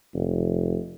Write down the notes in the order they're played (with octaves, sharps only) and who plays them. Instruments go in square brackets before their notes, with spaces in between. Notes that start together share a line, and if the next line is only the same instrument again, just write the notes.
[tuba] F1